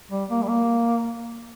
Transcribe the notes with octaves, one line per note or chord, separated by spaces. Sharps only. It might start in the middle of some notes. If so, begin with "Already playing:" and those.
G3
A#3
G3
A#3